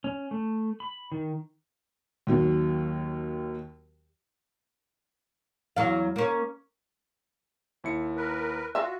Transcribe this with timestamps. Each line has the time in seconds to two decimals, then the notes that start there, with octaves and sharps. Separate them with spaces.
0.04 C#4
0.31 A3
0.80 B5
1.12 D#3
2.27 D#2 D#3 F#3
5.77 E2 F#3 F5
6.16 A#3 C#4
7.84 D#2 E4 C#7
8.17 A#4 B4
8.75 F4 F#4 E5